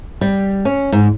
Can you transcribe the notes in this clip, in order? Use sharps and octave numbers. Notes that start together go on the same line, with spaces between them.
G3
C#4
G#2